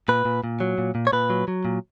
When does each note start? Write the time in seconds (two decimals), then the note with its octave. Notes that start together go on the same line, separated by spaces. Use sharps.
0.08 A#2 B4
0.25 A#2
0.44 A#2
0.60 F#3
0.78 A#2
0.95 A#2
1.07 C#5
1.13 A#2 B4
1.30 F#3
1.48 F#3
1.65 A#2